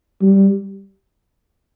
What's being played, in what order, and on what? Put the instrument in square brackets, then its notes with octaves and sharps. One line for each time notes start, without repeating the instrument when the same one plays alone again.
[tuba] G3